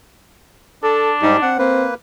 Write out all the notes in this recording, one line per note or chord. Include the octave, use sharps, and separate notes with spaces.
D4 A4
G#2 G3 D#4 G4
C4 F#5
A#3 C4 B4